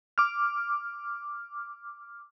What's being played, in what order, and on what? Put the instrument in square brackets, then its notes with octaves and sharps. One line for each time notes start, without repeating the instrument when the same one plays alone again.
[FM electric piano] D6 F6